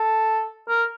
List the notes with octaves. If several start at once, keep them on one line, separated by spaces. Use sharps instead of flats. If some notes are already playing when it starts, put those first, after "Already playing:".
Already playing: A4
A#4